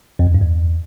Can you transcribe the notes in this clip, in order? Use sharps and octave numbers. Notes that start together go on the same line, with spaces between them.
F2
E2
G2
E2